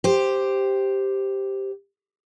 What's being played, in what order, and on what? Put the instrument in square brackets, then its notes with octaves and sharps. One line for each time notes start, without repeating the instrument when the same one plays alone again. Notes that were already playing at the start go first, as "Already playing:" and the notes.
[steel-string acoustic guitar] G4 C5